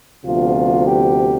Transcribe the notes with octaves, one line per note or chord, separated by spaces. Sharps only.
D2 C3 F3 B3 F4
G4